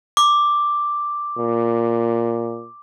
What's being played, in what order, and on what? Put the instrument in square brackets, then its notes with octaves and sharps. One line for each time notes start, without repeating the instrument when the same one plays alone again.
[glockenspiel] D6
[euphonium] A#2